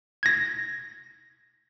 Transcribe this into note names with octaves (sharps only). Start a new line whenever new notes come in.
G#6 A#6